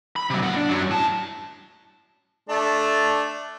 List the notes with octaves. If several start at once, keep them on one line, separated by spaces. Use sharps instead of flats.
B5
C3 F#3
A#2 F#5
D4
F#2 F#3
A2 A5
A3 D4